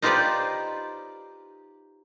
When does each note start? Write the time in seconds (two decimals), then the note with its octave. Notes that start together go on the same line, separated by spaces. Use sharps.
0.02 D#4 F4 G4 B4 C5 D5